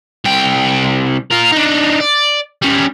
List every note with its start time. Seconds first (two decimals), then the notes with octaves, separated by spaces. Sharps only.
0.25 C2 G5
1.31 F4 A#4
1.53 D4 D#4
2.01 D5
2.62 G3 C#4